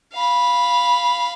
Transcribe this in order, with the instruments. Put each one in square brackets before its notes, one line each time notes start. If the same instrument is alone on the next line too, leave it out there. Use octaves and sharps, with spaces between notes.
[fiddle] F5 B5